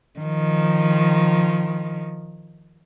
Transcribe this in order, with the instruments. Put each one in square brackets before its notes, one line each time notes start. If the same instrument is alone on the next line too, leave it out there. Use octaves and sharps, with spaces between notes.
[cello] D#3 F3